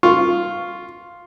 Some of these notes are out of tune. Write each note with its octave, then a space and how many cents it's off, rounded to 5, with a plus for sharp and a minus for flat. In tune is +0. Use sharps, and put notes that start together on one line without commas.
F4 +0 F5 +0 C#6 +0